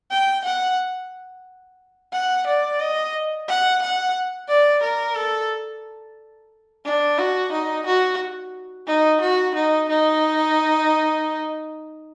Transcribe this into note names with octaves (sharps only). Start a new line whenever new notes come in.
G5
F#5
F#5
D5
D#5
F#5
F#5
D5
A#4
A4
D4
F#4
D#4
F#4
D#4
F#4
D#4
D#4